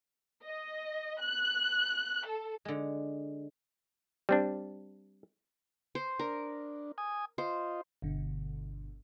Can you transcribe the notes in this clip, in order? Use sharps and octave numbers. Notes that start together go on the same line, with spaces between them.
D#5
F#6
A4
D3 G#3
G3 C4 D4
C5
D4 A#4
G#5 D#6
F4 C5 D#5
G1 B2 D3